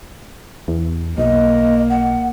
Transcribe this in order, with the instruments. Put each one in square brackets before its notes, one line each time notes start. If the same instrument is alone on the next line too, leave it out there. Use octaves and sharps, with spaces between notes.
[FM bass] E2
[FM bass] B1 [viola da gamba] A#3 [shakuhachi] D#5
[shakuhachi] F#5